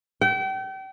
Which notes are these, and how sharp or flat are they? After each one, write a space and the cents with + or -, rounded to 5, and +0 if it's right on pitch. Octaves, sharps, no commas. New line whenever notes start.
G5 -35